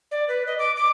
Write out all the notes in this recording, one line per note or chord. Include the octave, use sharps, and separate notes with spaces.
D5
B4
D#5
D6
D6